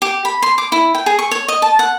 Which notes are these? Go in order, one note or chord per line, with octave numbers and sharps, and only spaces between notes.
G4
B5
C6
D6
E4
G5
G#4
C#6
C#5
D#5
A5
F#5